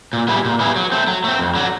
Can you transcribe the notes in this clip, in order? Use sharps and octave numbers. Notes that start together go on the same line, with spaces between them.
A#2
G3 B3 E4 G#4
A#2
G3 B3 E4 G#4
F#3
A3 C4
F#3
A3 C4
F2
D3 F#3